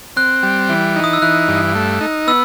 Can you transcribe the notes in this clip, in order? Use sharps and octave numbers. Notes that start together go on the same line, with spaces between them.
C4 F#6
G3
E3
D#4
D#6
E6
E3 F#6
G2
A3
D#4
B3 E6